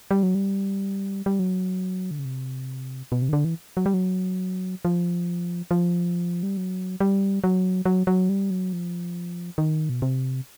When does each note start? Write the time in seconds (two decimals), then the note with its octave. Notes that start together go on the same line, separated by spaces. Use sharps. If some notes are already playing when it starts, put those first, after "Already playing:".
0.11 G3
0.23 F#3
0.35 G3
1.26 G3
1.39 F#3
2.11 D3
2.19 C#3
2.25 C3
3.12 B2
3.22 C3
3.29 D#3
3.33 D3
3.45 E3
3.77 F#3
3.86 G3
3.94 F#3
4.85 F3
5.71 F3
6.43 G3
6.57 F#3
7.00 G3
7.44 F#3
7.85 F#3
8.07 F#3
8.29 G3
8.50 F#3
8.73 F3
9.58 D#3
9.89 B2
10.02 C3